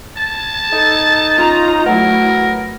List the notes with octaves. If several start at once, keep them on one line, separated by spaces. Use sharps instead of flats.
A5
D#4 A4
C#4 F4 A#5
F#3 A3 B3 E4 A#4